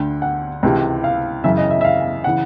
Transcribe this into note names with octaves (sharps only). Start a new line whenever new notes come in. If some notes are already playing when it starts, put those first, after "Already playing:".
Already playing: D2 D3 G5
F#5
C#2 C3 E3
F5
F#2 C#3 E3 E5
D#5
E5
E5
F5
C#3 E3 F#5